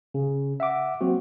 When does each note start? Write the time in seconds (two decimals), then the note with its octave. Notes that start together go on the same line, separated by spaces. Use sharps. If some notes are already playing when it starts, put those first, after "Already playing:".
0.14 C#3
0.60 E5 F#5 D6
1.01 F#3 A#3 C4 F#4